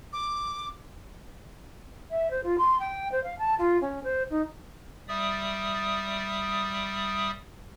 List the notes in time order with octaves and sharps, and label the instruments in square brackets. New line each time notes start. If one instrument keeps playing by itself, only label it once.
[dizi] D6
[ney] E5
C5
F4
C6
G5
C5
F5
A5
F4
C#4
C5
D#4
[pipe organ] G3 D5 E5 D#6